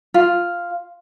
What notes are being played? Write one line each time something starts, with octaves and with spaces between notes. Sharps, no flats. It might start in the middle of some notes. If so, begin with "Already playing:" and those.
F4